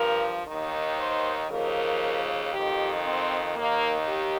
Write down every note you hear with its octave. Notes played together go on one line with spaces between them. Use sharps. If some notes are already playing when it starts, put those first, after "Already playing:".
Already playing: G2 F3 A#4
D#2 D#3
C5
D#2 C#3 F3 A#4
F2 D#3 G4
C4
D#2 D#3 A#3
G4